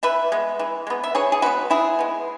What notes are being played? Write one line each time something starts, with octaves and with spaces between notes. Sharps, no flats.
E3 B4 E5
G#3 B3
E3
G#3 B3
E5
E3 G#4 C#5
G#4
G#3 B3 F#4 B4
E3 E4 G#4
G#3 B3